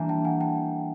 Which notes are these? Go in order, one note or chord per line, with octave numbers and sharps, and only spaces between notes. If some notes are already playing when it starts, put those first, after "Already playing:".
Already playing: E3 G3 A#3 D4 G4 G#5 A#5
G5 A5
F#5 G#5
G5 A5